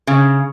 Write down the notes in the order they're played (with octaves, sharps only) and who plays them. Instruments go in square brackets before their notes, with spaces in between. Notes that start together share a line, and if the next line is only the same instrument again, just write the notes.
[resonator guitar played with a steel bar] C#3